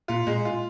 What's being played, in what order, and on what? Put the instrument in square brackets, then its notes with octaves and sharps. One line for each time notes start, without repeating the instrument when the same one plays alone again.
[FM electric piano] A#2 [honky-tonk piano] F4
[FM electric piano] A#2 [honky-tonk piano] G#3
[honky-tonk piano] F4